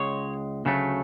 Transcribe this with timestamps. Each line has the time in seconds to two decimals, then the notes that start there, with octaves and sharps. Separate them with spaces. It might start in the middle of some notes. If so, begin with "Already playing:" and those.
Already playing: C#2 G#3 C#5
0.65 D2 C#3 F#3 A3